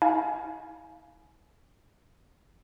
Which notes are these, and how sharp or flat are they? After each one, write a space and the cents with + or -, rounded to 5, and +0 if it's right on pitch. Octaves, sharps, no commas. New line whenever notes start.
E4 -40 F5 +0 G#5 +20